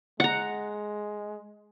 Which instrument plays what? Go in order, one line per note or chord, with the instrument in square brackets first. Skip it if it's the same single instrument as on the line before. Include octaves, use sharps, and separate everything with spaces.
[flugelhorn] G#3 [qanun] F#5 A#5